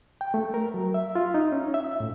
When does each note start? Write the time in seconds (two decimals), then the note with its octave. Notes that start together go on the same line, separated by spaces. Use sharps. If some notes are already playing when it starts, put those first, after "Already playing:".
0.21 G5
0.34 A3
0.54 A#4
0.74 F#3
0.94 E5
1.15 F4
1.34 D#4
1.52 C#4
1.74 E5
2.00 A2